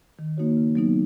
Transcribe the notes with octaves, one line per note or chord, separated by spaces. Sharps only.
D#3
A#3 D#4 F#4 C#5
C#3
F#3 B3 D#4